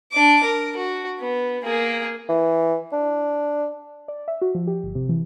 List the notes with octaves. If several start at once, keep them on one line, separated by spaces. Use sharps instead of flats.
D4 D6
A#4
F#4
B3
A#3 G#4
E3
D4
D5
E5
F#4
F3
G4
G1
C3
E3